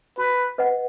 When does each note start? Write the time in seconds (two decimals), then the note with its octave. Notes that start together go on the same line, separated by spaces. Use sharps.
0.17 F#4 B4
0.58 B4 D#5 F#5